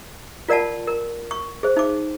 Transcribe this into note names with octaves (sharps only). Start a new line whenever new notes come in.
F4 A#4 D5 F#5 A5
A#4
C#6
G#4 C5
D#4 D6